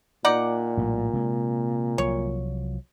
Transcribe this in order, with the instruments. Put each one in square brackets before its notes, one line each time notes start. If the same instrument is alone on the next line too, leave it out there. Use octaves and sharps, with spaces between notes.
[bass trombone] A#2 [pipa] D#4 D5 F#5
[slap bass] A#1 A2 G3
C3 G#3 A#3
[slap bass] C2 F3 F#3 [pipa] C#5